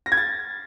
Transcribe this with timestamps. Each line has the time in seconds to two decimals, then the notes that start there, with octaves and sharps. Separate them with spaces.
0.06 A#6
0.12 G#6
0.17 A6